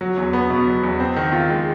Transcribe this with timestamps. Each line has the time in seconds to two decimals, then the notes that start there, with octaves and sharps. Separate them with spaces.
0.01 F#3
0.17 E2
0.33 B3
0.50 B2
0.67 F#3
0.83 E2
1.00 C4
1.16 D#3
1.33 F4
1.50 G#3